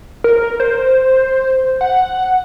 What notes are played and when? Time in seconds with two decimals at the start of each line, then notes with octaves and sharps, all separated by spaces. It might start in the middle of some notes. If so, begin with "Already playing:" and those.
0.24 A#4
0.60 C5
1.81 F#5